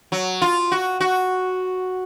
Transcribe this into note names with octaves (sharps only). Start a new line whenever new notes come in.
F#3
F4
F#4
F#4